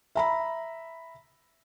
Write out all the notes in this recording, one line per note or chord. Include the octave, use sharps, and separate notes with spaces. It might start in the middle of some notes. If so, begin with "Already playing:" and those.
E5 A#5 B5